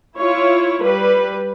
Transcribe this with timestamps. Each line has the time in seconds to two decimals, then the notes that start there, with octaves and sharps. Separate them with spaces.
0.18 E4 F4 C#5
0.83 G3 B4